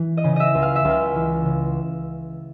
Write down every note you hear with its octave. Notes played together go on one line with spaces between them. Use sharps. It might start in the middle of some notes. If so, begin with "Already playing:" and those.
Already playing: E3
D#5
C#3
D#5 E5
C#2
F5
E5
C#2
F5
E3
C#3